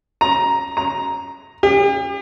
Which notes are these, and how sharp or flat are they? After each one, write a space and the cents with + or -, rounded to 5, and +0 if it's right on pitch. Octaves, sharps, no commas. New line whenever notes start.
A#5 +10
A#5 +5
G4 +45